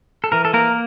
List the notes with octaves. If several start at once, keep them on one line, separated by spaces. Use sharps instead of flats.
A4
E3 A#4
A4
A#3 A#4